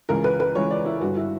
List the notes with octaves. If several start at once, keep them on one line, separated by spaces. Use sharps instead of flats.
C#2 C#3 E3 A#4
B4
B4
C#2 C#3 E3 C#5
D5
E4
G1 G2 D3 F#4
E4